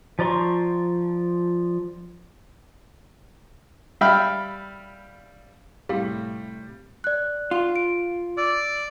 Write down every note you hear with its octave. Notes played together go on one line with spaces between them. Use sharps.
F3 D5 A#5 C6 C#6
G3 E5 F5 G5 B5 F6
A2 C3 G3 C4 E4 G4 F5
D5 F#6
F4
D7
D5 E6